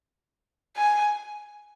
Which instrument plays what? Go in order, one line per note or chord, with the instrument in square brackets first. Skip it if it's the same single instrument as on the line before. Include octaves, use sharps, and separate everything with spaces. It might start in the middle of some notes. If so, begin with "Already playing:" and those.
[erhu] G#5